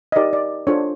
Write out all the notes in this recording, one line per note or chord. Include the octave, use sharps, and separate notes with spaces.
D#5
D#4 G4 A#4 D5
D5
D4 F4 A4 C5 C#5